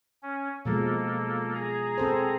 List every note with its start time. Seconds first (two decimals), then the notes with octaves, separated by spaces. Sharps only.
0.23 C#4
0.65 B2 F3 G#3 A#3 A4
1.54 G#4 A#5
1.98 C4 A4 C5